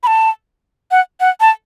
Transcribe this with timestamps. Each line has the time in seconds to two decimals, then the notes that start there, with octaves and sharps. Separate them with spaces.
0.03 B5
0.07 A5
0.91 F#5
1.20 F#5
1.41 A5